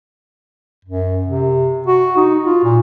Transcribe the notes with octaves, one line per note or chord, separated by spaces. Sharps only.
F#2
C3
F#4
D#4
F4
A#2